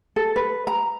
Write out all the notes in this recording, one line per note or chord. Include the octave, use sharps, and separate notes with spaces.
A4
B4
A#5